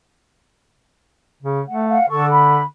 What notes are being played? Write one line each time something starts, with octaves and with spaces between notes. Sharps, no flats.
C#3
A3 F#5
F5 F#5
D3 A4 C#6
B5